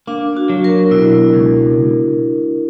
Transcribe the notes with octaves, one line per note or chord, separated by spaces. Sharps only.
A#3 D4
F#4
F#3
A#4
B2 E4
C#2